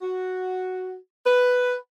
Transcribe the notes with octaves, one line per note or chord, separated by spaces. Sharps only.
F#4
B4